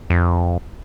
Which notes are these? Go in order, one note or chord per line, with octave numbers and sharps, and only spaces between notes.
F2